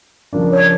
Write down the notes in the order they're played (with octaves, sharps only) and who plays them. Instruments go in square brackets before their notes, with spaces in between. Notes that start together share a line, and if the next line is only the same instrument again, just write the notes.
[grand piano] C#3 F3 A#3 D4
[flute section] C#5